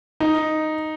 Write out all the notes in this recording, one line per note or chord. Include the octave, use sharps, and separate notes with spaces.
D#4